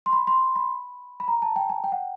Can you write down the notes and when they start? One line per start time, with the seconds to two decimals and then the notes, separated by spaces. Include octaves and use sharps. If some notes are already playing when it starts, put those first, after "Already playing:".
0.06 C6
0.13 B5
0.27 C6
0.56 B5
1.20 B5
1.28 A#5
1.42 A5
1.56 G5
1.70 G#5
1.84 G5
1.92 F#5